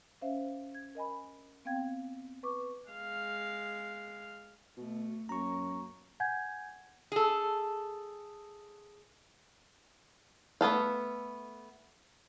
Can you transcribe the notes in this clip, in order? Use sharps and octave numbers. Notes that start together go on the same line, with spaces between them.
C#4 C5 E5 F5
G#6
A#4 D#5 G#5 B5
B3 C4 F5 G5 G#6
B4 C#6 D6
G#3 F5
B2 A3
F#2 A#3 A#5 C#6
F#5 G#5 G6 G#6
G#4 A4
A3 B3 A4 F5